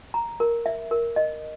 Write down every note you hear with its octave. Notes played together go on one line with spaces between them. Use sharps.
A#5
A#4
E5
A#4
D#5